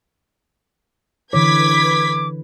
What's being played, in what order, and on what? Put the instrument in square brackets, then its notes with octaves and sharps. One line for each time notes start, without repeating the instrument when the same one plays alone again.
[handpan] D3 E3 C#5 [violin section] B4 G#6 B6 [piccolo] D6